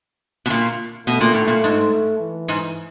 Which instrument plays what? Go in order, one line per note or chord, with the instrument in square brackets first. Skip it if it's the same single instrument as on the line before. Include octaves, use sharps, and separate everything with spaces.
[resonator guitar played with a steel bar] B2
A#2
[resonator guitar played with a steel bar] B2 [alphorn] A3
[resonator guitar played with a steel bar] A#2
A2
A#2
G#2
[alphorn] E3
[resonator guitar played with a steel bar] G#2